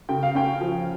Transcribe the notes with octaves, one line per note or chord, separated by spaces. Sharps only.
C#3 G5
F5
C#4 G5
F3